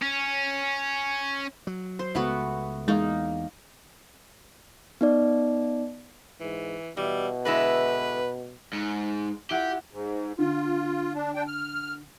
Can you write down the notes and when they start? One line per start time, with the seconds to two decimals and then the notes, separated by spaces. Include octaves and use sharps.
0.02 C#4
1.67 F#3
1.99 C5
2.15 C#2 A3 B3 F#4
2.88 E2 G#3 A#3 D#4
5.01 B3 D#4 D5
6.40 G#2 E3
6.97 B2 E3 G3
7.45 D3 G#3 E4 B4
8.73 G#2 C#7
9.50 E4 F4 G4 F#5
9.92 G#2
10.39 D3 F4
11.15 D4
11.35 D4 G5
11.47 F6